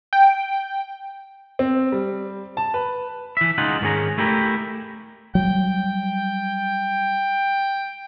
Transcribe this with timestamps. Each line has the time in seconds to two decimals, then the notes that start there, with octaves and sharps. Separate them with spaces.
0.13 G5
1.59 C4
1.92 G3
2.57 A5
2.74 B4
3.37 E3 E5
3.58 C#2 D#4 F4 G#4 F#5
3.81 G#2 D#3 C#4 G#4 A#5
4.18 A3 E4 G4 A#4
5.35 F#3 G3 G5